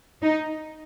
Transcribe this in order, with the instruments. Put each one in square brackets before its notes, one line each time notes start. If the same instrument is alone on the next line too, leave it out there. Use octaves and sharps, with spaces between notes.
[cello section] D#4